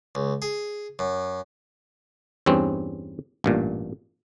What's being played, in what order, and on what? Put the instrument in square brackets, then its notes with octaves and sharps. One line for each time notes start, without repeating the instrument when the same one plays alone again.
[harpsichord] C#2
G#4
F#2
[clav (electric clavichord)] E2 G2 C4 C#4
A1 G2 A#2